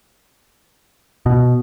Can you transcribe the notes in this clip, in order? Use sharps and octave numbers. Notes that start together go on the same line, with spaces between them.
B2